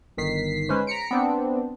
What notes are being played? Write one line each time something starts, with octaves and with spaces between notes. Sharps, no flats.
G1 D#3 B6 C7
G#3 C#4 B4 C5
A#5 B6 C#7 D7
B3 C4 D4